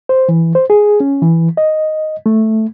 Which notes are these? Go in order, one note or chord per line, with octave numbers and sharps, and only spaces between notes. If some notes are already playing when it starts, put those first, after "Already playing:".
C5
E3
C5
G#4
C#4
E3
D#5
A3